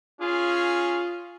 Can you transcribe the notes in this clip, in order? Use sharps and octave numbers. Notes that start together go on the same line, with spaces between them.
C#4 F4 G#4